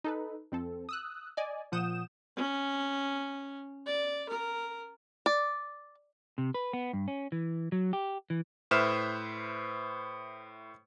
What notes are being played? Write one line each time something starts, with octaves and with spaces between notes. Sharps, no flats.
D#4 A4 B4
F2 C4 A4
D#6 E6 F#6
D5 D#5 G#5
A#2 F3 F#5 D#6 G6 E7
C#4
D5
A#4
D5
C3
B4
B3
G2
C#4
E3
F#3
G4
E3
A2 B4 C5 E5 F6 E7